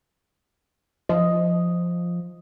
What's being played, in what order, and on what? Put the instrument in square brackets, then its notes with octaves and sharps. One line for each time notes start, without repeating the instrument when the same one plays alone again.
[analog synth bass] F3 [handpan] D#5